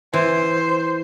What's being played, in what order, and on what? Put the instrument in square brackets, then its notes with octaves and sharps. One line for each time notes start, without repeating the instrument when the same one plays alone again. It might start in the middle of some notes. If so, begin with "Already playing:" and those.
[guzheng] E3 [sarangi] C5